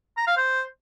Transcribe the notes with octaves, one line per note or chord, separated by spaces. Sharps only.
A#5
F5
C5